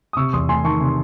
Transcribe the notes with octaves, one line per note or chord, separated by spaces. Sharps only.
D#6
C3 C#6 E6
E2 C6 D#6
A3 G#5 C6
D#3 A5 C#6
C3